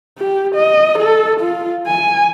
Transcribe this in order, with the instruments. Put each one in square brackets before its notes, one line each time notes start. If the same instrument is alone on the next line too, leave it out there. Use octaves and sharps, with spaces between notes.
[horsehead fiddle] G4
D#5
A4
F4
G#5